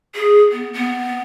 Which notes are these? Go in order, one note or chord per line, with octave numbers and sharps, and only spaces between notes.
G#4
B3
B3